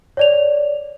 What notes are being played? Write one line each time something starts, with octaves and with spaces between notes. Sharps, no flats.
C#5 D5 F7